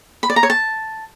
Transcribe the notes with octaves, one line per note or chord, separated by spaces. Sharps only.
B5
D5
A#5
C#5
A5